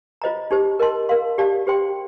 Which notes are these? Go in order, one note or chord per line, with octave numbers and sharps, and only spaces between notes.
F4 C5 D#5 A#5
D#4 G4 C5
A#4 D#5 A5 C6
A#4 F5 C6
G4 D5 F5 A5
G4 C5 G5 C6